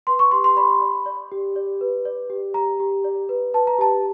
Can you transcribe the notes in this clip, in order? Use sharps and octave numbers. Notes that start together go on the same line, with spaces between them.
B4 C6
C#6
G4 C6
C6
D5 B5
D5
D5
G4
D5
B4
D5
G4
G4 A#5
G4
D5
B4
B4 A5
A#5
G4 A5